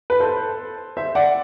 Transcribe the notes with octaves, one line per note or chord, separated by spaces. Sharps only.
B4
A4 C5
C5 E5
D5 F#5